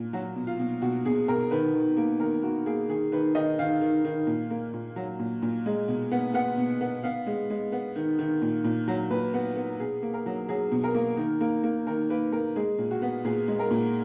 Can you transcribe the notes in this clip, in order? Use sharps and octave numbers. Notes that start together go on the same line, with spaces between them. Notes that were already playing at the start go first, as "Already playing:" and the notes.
Already playing: A#2
F#3 F#4
B2
F4
B2
B2 F#4
B2 G#4
B2 A#4
D#3 B4
D#3
A#3
D#3 A#4
A#3 F#4
A#3 G#4
D#3 G#4
D#3 B4
D#3 D#5
D#3 F5
D#3
D#3
A#2
A#3
A#2
F#3
A#2
A#2
G#3
B2
B3
B3 F#5
B2
B3
B3 F5
G#3
G#3
B3
D#3
D#3
A#2
A#2
F#3
A#2 B4
B3
B3
B2 G#4
A#3
A#4
F#3
F#3 G#4
B2
A#4
A#3
D#3
A#3
A#3
D#3 A#4
A#3 B4
A#3 A#4
G#3 G#4
A#2
F#4
B3
A#2 G#4
G#3
A#4
A#2